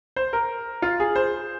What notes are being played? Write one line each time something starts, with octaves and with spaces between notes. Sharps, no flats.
C5
A#4
F4
G#4
C5